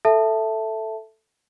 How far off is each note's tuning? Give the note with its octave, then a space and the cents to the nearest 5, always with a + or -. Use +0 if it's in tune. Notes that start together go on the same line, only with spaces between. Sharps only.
A4 +0 E5 +0 A5 +0